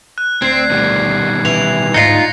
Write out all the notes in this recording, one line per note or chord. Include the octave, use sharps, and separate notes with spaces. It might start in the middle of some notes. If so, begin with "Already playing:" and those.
F#6
D2 C4 G#6 C7
B2 D#3 G3
E3 F7
D2 G#2 D#4 F4 D#5 A#6 C7 C#7